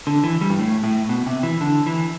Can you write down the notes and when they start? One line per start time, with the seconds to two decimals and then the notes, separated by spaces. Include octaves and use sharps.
0.07 D3
0.24 E3
0.41 G3
0.50 G2
0.59 A2
0.84 A2
1.09 B2
1.26 C3
1.43 E3
1.61 D3
1.87 E3